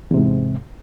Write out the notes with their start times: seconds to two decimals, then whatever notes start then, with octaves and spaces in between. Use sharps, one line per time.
0.11 E2
0.14 C3
0.17 G#2